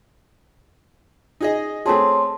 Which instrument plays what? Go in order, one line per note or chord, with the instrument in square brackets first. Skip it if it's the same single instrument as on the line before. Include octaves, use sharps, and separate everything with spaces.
[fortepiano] D#4 G#4 D#5
[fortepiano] A3 C4 G#4 [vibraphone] C#5 A5 C6